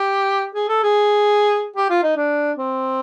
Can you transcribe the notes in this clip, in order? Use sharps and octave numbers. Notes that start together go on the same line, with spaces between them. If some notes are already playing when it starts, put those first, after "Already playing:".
Already playing: G4
G#4
A4
G#4
G4
F4
D#4
D4
C4